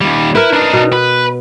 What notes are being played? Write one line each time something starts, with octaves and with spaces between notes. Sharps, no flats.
D#2 G3
E4 A#4 B4
D4 D#4
B2
B4